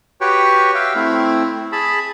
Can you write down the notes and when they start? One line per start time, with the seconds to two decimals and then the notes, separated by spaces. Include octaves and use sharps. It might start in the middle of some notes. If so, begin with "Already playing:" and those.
0.21 F#4 G4 B4 C#5 G5
0.75 E5 F5 G5
0.95 A3 C4 E4
1.72 G#4 A5 B5